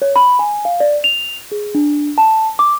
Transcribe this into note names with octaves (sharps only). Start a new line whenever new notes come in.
C#5
B5
G#5
F5
D5
F7
G#4
D4
A5
D6